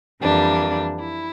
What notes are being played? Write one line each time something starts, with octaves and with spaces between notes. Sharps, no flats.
F2 E3 G3 A#3 D4
E4